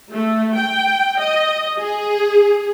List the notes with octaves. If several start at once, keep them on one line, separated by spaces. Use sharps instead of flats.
A3
G5
D#5
G#4